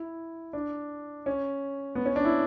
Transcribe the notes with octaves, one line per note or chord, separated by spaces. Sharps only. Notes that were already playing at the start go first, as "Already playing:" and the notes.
Already playing: E4
D4
C#4
B3
C#4
D4
E4